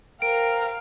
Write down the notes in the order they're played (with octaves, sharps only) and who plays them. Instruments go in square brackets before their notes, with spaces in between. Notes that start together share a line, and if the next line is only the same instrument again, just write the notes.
[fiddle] A#4 [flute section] C5 G5 A#5 [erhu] F5 [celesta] D7